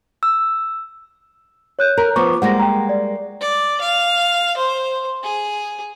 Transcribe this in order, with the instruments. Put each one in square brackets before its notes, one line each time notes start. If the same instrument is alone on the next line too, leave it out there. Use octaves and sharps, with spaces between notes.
[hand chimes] E6
[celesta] C#5 F#6 G6
[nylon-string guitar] A#4
[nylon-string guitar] F3 B3 [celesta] A#5 C#6 D6
[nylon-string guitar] G3 G#3 A#3 [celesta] F#5 A#6
[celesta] G5 A#5
D5
[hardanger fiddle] D5
F5
C5
G#4